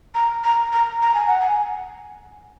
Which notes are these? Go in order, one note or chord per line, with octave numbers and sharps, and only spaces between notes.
A#5
A#5
A#5
A#5
G#5
F#5
G#5